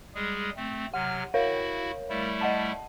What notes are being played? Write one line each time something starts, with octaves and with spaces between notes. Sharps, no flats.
G3 G#3 G#4
A3 C4
C3 F#3 F#5 F6
E4 F#4 A#4 C#5 F5
G3 A3 E4
D#5 F#5 A5